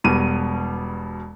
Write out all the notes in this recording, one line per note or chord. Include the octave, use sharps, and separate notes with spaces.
E1 B2 G3 D#7